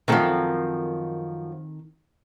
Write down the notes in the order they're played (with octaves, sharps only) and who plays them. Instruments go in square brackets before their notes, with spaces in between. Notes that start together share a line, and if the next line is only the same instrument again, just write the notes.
[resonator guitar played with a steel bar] F#2 F3 [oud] D#3 C4 A4